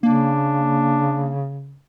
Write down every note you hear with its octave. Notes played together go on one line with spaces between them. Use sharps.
C#3 A#3 D4